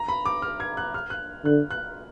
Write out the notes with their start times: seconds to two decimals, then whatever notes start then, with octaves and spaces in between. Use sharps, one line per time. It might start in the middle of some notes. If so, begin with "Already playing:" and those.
Already playing: A#5
0.08 B5
0.26 D6
0.42 F6
0.60 G#6
0.77 F#6
0.94 F6
1.10 F#6
1.44 D3 F#6
1.71 F#6